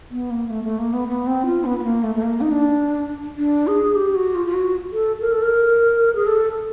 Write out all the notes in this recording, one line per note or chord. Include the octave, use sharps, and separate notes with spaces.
B3
A#3
A3
A3
A#3
B3
B3
C4
F4
B3
B3
A#3
A3
A3
A#3
D#4
D4
D4
G#4
G4
F#4
F4
F4
F#4
A4
A#4
A4
A#4
G#4
A4